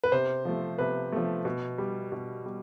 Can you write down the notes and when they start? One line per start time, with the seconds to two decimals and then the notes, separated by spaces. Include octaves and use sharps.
0.04 B4
0.12 C3 C5
0.45 F3 A3
0.78 C3 B4
1.12 F3 A3
1.45 B2
1.78 G3
2.12 B2
2.45 G3